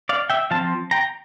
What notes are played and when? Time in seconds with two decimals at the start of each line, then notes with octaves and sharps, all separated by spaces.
0.09 D5 F5
0.30 E5 G5
0.51 F3 C4 F5 A5
0.91 G5 A#5